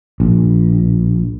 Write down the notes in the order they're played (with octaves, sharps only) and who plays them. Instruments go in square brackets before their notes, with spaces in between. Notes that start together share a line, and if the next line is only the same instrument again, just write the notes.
[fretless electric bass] A#1